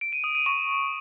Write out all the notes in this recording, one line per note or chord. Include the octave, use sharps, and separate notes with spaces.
D7
D#7
D#6
D#7
C#6